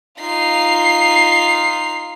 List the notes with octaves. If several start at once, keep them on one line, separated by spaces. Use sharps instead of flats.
D#4 F4 C7